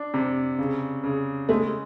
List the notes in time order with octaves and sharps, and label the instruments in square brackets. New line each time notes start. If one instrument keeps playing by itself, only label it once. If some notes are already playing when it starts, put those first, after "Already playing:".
Already playing: [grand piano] D4
C3
C#3
C#3
[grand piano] G#3 [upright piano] A3